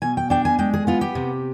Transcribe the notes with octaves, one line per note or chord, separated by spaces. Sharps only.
B2 G#5
G5
D4 G5
G#5
G#3 G5
G#4
B3 F4
G4
C3